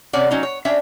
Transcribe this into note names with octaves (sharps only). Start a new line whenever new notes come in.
C3 C#4 C#5 D5 F#5
F#3 C#4 D#4
C#5
C#4 D4 E5 G5